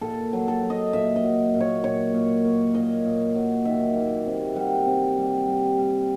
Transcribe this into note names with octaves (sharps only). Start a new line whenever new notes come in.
A#2 A4
F#3
A4
F#3
D#5
A#2 E5
D#5
F#3
A#2
C#5
A#2 C#5
A#2
A#3
A#2 D#5
A#2
F#3
D#3 E5
A#3
C3
G3 F#5
C3
G3
G3
G3